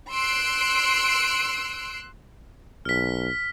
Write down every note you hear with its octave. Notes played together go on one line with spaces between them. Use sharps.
C6 E6 F#6 D7
B1 F6 B6